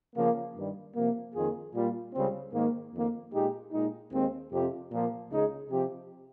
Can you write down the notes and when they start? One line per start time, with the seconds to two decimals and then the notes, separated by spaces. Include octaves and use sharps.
0.16 C#3 F3 A#3
0.55 G2 D#3 G3
0.95 C3 F3 A#3
1.34 F2 D#3 A#3 F4 G#4
1.74 A#2 G3 A#3 F4
2.13 C#2 C#3 G3 C4
2.53 G#2 D#3 A#3
2.93 F2 D#3 A#3
3.33 A#2 G#3 D#4 G4
3.72 A#2 G#3 D#4
4.11 D#2 D#3 G#3 C4
4.52 F2 C3 F3 C4 G4
4.91 A#2 F3 A#3
5.30 C#2 C#3 G#3 D#4 G#4
5.70 C3 F3 C4 G4